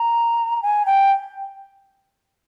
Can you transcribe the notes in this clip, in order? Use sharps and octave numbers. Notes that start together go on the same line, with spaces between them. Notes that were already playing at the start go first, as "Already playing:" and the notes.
Already playing: A#5
G#5
G5